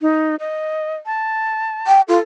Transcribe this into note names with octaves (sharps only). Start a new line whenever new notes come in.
D#4
D#5
A5
G5
F4 A4